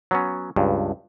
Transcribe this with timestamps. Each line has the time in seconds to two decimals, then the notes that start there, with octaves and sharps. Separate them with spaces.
0.11 F#3 B3 C#4
0.56 C#2 G2